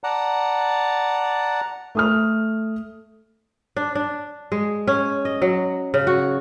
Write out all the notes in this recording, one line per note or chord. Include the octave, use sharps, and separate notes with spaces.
D5 F#5 A5 A#5
A3 D#6 F6
D4
D4
G#3
C#4
D#5
F#3
C#3
F#4